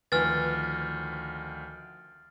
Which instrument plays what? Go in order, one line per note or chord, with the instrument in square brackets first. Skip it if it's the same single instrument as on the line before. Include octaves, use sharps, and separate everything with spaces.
[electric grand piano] D2 D#3 F3 [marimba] B4 G#5 [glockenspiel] F6 A6